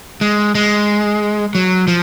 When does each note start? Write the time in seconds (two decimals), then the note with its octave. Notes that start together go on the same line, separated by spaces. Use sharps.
0.21 G#3
0.55 G#3
1.55 F#3
1.88 F3